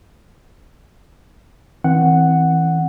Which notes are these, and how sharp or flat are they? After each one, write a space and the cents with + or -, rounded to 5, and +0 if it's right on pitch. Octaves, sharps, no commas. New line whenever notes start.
E3 -35 C4 +5 F#5 +0